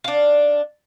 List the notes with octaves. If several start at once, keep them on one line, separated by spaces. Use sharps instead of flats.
D4 F5